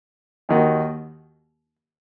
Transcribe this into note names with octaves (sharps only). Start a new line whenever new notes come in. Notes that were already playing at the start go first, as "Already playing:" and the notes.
D#2 D#3 A#3 D#4 F#4